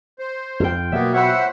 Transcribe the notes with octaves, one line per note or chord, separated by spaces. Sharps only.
C5
F2 F4 G5
B2 F#3 A#3 B3 E5
C5 C#5 E5 F#5 B5